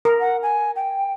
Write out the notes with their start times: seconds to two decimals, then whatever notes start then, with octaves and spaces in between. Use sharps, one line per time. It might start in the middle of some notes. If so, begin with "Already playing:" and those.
0.05 A#4
0.20 F#5
0.43 G#5
0.76 G5